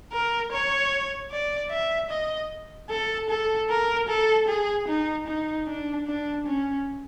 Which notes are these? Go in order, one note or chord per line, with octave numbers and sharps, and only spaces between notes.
A#4
C#5
D5
E5
D#5
A4
A4
A#4
A4
G#4
D#4
D#4
D4
D4
C#4